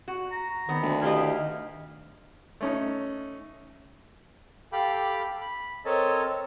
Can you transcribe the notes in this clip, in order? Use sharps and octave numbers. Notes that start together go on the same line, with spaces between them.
F#4
A#5
D#3 B3 C4
D2
E4 G4 D#5 F5
A3 C#4 D#4
G4 A4 F5 G5 B5 D6
B5
C4 A4 A#4 C#5 D#5 A5